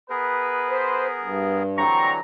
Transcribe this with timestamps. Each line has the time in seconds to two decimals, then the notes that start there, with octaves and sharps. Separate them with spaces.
0.10 B3 G#4 A#4 B4
0.70 C5
1.21 G2
1.78 D3 E3 F#3 G3 C4 A#5 C#6